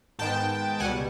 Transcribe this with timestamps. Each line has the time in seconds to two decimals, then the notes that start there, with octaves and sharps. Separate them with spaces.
0.19 G#2 D#3 G#3 B3 G5 A5
0.80 C#2 B2 G3 F#5 G#5